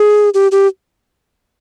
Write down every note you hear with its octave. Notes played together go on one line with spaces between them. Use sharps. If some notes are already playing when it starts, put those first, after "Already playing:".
Already playing: G#4
G4
G4